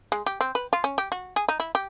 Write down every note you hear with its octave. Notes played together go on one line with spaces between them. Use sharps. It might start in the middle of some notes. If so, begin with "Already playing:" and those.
G#3
G4
C4
B4
F4
C#4
G4
F#4
G#4
D#4
E4
G4